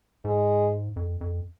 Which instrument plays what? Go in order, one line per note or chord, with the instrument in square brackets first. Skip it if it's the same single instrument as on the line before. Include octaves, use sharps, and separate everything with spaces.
[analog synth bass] G#2 [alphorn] G#3
[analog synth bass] F2
F2